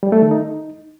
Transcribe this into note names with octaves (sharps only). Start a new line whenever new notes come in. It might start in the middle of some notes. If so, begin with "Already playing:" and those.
G3
A3
D#3
D#4